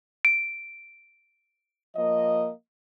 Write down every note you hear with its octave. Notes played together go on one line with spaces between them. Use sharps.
D7
F3 A#3 D#5